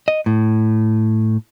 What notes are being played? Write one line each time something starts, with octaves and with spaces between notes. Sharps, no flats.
D#5
A2